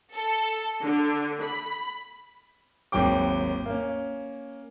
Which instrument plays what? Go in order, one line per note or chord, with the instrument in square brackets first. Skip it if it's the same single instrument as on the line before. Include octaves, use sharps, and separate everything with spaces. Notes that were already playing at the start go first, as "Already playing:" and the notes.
[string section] A4
D3
B5
[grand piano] G#1 D#2 F#3 G5 D6
A#3 C#4